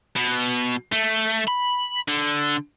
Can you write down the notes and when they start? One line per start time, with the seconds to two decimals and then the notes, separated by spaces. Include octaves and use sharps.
0.16 B2
0.92 A3
1.48 B5
2.08 D3